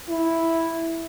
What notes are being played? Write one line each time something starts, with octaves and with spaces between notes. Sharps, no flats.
E4